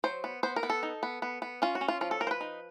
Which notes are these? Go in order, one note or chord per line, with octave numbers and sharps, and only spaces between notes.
F#3 C5
B3
B3 C5
A#4
B3
A4
D#4
B3
B3
B3
C#4 F4
F#4
C#4
F4
F3 F4
A4
F3 A#4
C5
B4
D#4